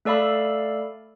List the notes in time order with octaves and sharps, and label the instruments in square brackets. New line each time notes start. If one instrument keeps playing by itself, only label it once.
[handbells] A3 A4 D5 F5 B5 E6